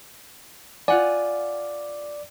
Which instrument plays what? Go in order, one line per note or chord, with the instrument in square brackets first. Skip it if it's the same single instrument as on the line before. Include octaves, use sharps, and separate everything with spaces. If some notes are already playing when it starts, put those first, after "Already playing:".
[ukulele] F4 F#5 G#5 [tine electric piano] D5